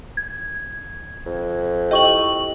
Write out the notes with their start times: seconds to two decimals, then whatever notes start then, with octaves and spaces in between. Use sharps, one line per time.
0.17 G#6
1.26 F2
1.91 E4 G4 D#5 G5 C#6 F#7